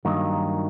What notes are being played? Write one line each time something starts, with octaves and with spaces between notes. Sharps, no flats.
G2 D#3 F#3 A#3 D#4